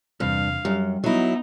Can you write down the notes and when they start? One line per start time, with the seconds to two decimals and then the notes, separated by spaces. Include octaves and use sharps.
0.20 E2 G2 C3 C4 F5
0.65 F#2 G3 G4
1.04 F#3 B3 D#4 E4